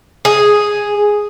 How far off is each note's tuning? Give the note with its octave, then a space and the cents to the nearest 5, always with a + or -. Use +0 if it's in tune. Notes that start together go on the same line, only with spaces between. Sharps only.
G#4 +0